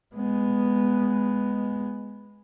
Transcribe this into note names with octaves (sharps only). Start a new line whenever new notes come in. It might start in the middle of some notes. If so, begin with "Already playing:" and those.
G#3 B3